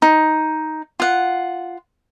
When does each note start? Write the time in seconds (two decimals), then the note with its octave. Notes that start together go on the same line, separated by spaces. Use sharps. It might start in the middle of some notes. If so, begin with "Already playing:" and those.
0.02 D#4
1.00 F4 F#5